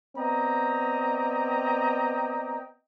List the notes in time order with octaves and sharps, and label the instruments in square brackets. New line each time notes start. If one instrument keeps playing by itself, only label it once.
[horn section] B3 C4 D5 D#5 G5 A#5